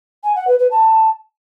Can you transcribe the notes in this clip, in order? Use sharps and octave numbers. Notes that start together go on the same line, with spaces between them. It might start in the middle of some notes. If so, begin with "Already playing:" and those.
G#5
F#5
B4
B4
A5